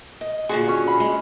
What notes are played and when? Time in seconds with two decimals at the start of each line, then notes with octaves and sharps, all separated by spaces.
0.21 D#5
0.49 A#2 D3 F#4 G#4 C6
0.67 C#4 C#5 G#5
0.87 B5
1.00 G#3